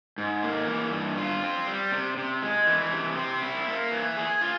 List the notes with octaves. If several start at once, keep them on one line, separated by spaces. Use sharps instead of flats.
G#2
A#3
E3
G2
F4
C4
G3
C3
C3
G#3
E3
C3
C4
E4
A#3
E3
G#4
F4